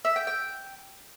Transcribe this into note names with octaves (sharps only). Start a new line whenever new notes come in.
E5
G5
G5